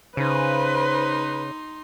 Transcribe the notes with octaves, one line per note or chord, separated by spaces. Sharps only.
C#3 D#4 B4 C5 C6